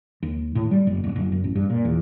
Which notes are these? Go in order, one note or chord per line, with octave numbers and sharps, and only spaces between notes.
D#2
A2
G3
F#1
D1
F#1
F#2
A1
G2
A#2
E2